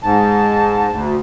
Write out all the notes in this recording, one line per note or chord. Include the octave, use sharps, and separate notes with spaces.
G#2 A5
D2